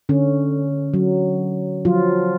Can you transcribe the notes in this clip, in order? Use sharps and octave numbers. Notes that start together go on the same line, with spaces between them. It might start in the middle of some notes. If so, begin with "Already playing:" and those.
D3 C#4
F#3
F3 F#3 F4